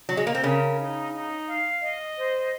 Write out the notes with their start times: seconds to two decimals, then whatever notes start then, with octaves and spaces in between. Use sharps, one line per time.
0.09 F#3
0.17 G#3
0.27 A#3
0.35 C4
0.43 C#3 C#4 A#4
0.79 D#4
1.14 D#4
1.48 F5
1.82 D#5
2.17 C5